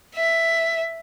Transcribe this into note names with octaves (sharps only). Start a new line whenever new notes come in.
E5